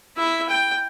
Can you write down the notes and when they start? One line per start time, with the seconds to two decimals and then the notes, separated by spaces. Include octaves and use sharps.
0.17 E4 E5
0.49 G5